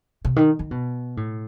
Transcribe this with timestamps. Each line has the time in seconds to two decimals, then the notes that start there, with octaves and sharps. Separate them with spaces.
0.25 C3
0.36 D#3
0.59 D#3
0.71 B2
1.17 A2